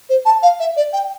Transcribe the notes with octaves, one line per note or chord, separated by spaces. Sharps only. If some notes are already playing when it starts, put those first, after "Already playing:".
C5
A5
F5
E5
D5
G5